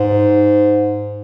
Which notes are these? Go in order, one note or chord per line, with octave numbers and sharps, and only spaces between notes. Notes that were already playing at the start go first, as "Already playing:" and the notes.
Already playing: G#2